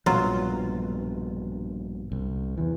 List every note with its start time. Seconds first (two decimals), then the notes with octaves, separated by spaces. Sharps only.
0.06 A#1 G2 B2 F#3 F4
2.12 C2
2.58 E2 E3